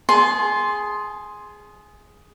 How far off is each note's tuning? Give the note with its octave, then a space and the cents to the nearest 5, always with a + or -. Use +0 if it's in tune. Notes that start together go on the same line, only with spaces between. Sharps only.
G#4 +0 A5 -30 C6 +0